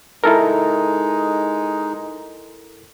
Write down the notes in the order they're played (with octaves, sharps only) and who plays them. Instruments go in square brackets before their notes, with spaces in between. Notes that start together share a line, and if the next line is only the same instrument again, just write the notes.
[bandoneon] G#3 D#4 [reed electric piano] E4 A4 A#4